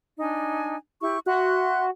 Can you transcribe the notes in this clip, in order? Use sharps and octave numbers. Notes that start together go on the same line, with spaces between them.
D4 D#4 G#5
E4 G4 C#6
F#4 E5 C6 F#6